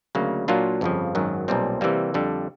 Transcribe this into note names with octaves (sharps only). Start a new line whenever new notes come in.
D2 C#3 F#3 A#3
A#2 F#3 A#3 D4 F4
G1 F2 C#3 F3
G#1 F#2 D#3 F#3
B1 A#2 G3 C4
C3 E3 G3 A#3
F2 D3 G3